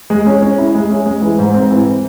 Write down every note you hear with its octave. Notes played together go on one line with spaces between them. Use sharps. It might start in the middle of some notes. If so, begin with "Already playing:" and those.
G#3
C#4
C#4
E4
G#3
C#4
G#3
E3
G#2
C4
E3